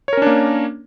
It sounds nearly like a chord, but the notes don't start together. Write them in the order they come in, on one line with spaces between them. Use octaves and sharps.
C#5 A#4 C#4 D4 A#3